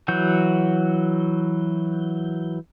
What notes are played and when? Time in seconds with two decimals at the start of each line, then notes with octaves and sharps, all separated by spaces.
0.08 E3 F#3 F#4 G6